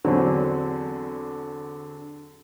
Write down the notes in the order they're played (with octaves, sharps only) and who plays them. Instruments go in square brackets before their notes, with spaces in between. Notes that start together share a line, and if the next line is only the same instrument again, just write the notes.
[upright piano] E2 D3 F#3 C4